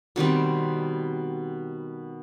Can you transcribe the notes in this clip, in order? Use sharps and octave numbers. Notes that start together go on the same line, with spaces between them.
B2 D#3 G3 C4